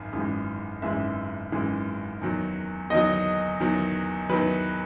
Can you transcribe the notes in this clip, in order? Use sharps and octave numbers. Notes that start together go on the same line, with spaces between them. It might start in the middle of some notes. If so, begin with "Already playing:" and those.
Already playing: G#1 F#2
G#1 F#2 E3 G#3
G#1 F#2 E3 G#3 E5
G#1 F#2 E3 G#3
E2 D#3 F#3
E2 D#3 F#3 D#5
E2 D#3 F#3
E2 D#3 F#3 B4